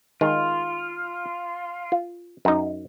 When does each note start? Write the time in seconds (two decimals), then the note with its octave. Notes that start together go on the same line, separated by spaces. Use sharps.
0.21 D#3 G#3 F4
1.92 F4
2.45 F#2 D#4